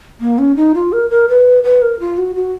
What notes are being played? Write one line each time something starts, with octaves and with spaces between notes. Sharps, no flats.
A#3
C#4
D#4
F4
A#4
A#4
B4
B4
A#4
F4
F#4
F#4